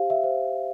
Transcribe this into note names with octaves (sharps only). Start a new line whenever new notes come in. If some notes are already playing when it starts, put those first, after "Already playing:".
Already playing: G4 C5 F5
E5
C5